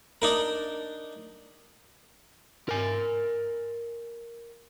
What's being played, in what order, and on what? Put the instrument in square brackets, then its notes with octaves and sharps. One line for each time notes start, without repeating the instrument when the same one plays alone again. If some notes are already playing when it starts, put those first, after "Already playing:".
[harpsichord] D4 D#4 A#4
[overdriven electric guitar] A#4 G#5